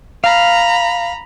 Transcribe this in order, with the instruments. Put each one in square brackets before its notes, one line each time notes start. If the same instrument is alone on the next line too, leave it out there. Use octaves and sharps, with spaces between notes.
[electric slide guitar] F5 [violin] A#5 B5